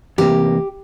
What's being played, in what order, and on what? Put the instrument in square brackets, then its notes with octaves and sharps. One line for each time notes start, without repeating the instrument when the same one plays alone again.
[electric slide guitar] E2 C3 A#3 [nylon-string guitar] G4